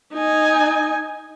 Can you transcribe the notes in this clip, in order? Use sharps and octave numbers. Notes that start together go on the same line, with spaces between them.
D#4 G#5